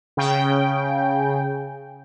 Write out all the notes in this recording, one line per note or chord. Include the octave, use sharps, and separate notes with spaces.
C#3 G5